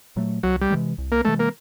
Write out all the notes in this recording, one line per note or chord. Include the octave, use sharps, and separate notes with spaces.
A#2 F#3 A3
C2 F#3
G3
C3 E3 G#3
C2
A#3
C3 E3 G#3 A3
A#3